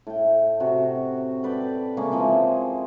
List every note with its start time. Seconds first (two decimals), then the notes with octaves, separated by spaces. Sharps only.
0.07 A2 G5
0.60 C3 F#4
1.43 A4 B4 D5 G5
1.97 C#3 G#3 A#3 C#4
2.12 E3 F3 G#3 C4